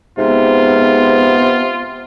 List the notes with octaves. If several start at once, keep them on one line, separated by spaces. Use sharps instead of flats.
G#2 C3 B3 F4